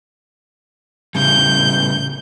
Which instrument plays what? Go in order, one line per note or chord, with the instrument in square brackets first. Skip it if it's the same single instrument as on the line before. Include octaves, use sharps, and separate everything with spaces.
[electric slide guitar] A2 C#3 G3 [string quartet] G6